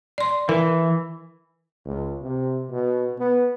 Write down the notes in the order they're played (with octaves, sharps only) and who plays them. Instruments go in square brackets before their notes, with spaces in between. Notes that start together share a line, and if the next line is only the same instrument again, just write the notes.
[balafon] D5 C6
[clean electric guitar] E3 [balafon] A#4
[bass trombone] C#2
C3
B2
B3